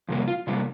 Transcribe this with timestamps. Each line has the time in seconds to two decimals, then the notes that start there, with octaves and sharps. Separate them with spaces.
0.08 F2 C3 G3 A#3
0.28 F4
0.47 C3 G3 A#3 F4